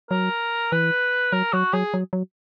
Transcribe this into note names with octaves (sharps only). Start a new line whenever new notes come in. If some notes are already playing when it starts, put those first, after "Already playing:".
F#3 A#4
E3 B4
F#3 A#4
F#3 F#4
F#3 G#4
F#3
F#3